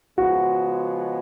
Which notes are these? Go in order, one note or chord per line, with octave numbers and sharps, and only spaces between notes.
C#3 F3 G#3 B3 F#4